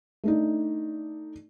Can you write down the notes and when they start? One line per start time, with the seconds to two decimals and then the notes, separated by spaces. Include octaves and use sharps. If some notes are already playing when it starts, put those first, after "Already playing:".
0.24 A3 D4 D#4